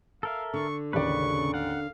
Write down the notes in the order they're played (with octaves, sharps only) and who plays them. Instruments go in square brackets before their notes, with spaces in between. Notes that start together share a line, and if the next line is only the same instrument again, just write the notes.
[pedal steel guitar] A4 A#4 E5 [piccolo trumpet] F5
[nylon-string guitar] D3 [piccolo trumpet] C#6
[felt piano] A1 D#2 D5 [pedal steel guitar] C#3 B4 [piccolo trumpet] C#6
[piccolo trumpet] F5 [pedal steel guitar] F#5